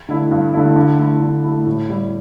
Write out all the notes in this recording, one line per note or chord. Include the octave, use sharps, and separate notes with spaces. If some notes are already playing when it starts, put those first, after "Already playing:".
D3 A3 E4
G2
D3 A3 E4
D3
A3 E4
D3
A3 E4
A2
G3 E4